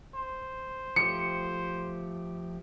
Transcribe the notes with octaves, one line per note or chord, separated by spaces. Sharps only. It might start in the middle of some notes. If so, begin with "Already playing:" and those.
C5
F3 A3 G4 C#7